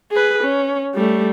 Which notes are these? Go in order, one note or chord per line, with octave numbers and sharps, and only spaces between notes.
G#4 B4
C#4
G3 A3